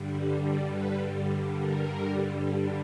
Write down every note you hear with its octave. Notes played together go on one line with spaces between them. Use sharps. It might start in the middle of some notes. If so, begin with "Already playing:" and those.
Already playing: G2 D3 G3
B4
A#4